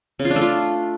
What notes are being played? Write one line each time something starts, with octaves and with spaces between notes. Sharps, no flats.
C#3
F4
D4
A3
F4